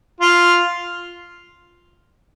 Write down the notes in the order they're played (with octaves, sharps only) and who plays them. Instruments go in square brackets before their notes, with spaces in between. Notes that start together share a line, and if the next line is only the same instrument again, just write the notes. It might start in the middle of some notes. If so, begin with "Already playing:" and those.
[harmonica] F4